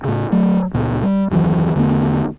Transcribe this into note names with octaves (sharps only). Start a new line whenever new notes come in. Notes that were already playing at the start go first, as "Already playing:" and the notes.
A2 C#3
F#3 A3
C#2 A#2 B3
G3
F#1 D#2 E3 F#3
E2 D3 A3 B3